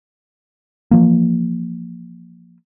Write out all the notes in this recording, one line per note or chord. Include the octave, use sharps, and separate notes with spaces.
E3 F3 A#3